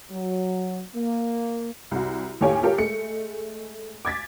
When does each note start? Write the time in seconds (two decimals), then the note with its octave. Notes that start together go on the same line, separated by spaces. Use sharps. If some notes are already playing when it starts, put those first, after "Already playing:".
0.11 F#3
0.96 A#3
1.91 C2 F#4
2.41 D#2 A2 G4 C#5 F5 G#5
2.63 F4 G4 A4 A#4 C#5
2.78 G#3 A3 C#7
4.05 D6 G#6 A6 B6